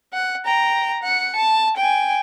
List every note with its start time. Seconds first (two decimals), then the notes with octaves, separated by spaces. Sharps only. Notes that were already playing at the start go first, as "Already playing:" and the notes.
0.13 F#5
0.45 G5 A#5
1.03 F#5 C#7
1.36 A5
1.77 G5 G#5